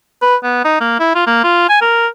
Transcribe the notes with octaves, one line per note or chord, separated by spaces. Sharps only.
B4
B3
D#4
A#3
E4
F4
A#3
F4
G#5
A#4